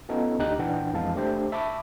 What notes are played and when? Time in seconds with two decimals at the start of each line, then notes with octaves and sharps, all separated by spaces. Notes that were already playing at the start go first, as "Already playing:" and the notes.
0.09 B3 C#4 D#4 F4 A4
0.39 D2 D4 D#4 G4 F#6
0.59 A#2 E3 D4 F#5 G5
0.93 F2 E3 G#3 F5 A5
1.15 A3 D4 G4 C5
1.52 E5 A5 B5 C#6 D6